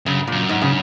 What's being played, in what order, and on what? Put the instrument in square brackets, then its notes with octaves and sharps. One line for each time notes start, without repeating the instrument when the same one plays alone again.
[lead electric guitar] F#2 [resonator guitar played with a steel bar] C#3
[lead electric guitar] F#2 [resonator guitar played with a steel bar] A#2
[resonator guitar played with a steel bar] G#2
C#3